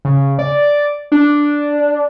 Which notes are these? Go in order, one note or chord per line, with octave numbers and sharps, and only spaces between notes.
C#3
D5
D4